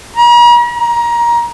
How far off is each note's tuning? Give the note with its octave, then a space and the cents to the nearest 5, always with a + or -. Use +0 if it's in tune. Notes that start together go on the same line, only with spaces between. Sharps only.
A#5 +45
A#5 +20